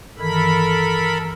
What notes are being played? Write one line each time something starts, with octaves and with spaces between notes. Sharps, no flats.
G2 D#3 E3 A4 A#4 B5